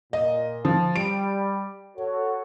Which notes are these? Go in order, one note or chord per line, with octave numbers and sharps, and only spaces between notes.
A#2 D#5
F3
G3 D7
F#4 A4 C#5